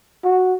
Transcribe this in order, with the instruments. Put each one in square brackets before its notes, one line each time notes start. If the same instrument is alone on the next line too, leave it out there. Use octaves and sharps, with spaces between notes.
[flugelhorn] F#4